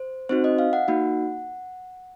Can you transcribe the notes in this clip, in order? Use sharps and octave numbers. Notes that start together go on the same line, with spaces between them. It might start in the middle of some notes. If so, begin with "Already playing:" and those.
Already playing: C5
C4 D#4 F#4 C5
D#5
F5
F#5
A#3 D#4 F#4